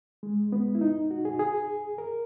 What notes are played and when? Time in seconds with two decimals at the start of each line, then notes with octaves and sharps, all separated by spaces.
0.23 G#3
0.52 B3
0.75 E4
0.81 D#4
1.11 F#4
1.25 G#4
1.39 G#4
1.98 A#4